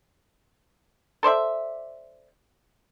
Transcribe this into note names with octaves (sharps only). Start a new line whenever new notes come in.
A4 C5 D5 E5